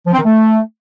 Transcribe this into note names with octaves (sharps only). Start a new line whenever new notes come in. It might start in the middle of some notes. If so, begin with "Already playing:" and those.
F3
C4
D#3
A3